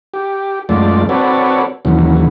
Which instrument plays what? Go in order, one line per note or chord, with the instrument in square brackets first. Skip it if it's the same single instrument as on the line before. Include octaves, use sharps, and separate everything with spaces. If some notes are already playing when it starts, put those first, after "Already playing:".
[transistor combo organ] G4
F#2 G#3 A3 F4 D5
C4 F#4 A4 B4 C#5 D5
D#2 C#3 E3 F#3